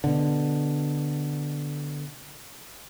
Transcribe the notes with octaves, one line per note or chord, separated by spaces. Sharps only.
B2 D3